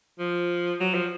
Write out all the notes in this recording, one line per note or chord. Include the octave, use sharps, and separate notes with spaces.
F3
F#3
F3